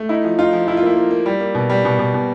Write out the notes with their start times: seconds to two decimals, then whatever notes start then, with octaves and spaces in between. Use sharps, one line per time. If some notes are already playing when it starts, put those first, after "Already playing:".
Already playing: A3
0.09 D#4 E4
0.24 F3
0.39 D#4 F4
0.53 F3
0.68 F3 E4
0.77 F4
0.82 A#3 E4
0.96 A#3
1.11 A#3
1.26 G3
1.40 A#3
1.55 B2
1.70 G3
1.85 B2
1.99 B2
2.14 B2